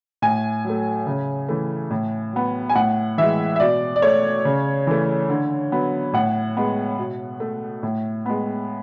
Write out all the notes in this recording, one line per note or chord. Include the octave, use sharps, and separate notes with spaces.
A2 G#5
F#3 A3
C#3
E3 A3
A2
F#3 B3
G#5
A2 F#5
E3 G#3 E5
E5
B2 D5
D5
A3 C#5
C#3
E3 A3
D3
F#3 B3
A2 F#5
G#3 B3
B2
A3
A2
G#3 B3